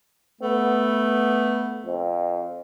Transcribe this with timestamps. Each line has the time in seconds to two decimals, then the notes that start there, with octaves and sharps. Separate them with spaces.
0.41 A3 B3
1.86 F2